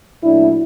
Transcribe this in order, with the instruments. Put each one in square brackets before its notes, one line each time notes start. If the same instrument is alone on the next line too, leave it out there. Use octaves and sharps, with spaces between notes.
[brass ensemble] A#2 F#3 A3 D4 E4